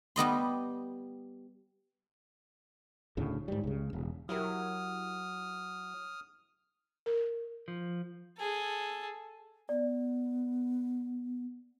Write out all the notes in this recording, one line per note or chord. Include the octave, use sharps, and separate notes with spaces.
G3 B3 D#5 C6
D2 A2 C#3
G#2 G3
C#2 C#3
E1
F#3 E4 G4 A#4 D#6 F6
A#4
F3
G#4 A4
B3 D5